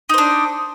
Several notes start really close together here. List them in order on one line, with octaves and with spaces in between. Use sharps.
D#4 C5 D4